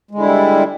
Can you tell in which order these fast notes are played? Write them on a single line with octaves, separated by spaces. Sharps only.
G#3 D3 E4 G3